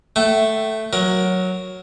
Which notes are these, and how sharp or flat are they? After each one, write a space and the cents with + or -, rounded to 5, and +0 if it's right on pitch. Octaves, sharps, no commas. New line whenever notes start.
A3 +0 G5 -45
F#3 +0 A#4 +15